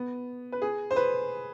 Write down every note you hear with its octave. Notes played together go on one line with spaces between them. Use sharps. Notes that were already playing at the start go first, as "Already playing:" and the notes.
Already playing: B3
B4
G#4
C5
B4